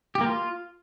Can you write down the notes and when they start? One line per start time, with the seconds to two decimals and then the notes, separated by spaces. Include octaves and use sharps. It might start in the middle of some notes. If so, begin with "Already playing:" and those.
0.15 G4
0.21 A#3
0.26 F4